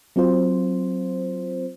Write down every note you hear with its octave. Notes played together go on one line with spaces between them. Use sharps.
F#3 C4 F4 C5